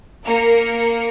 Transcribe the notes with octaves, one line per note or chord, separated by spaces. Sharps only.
A#3 A#4 C#7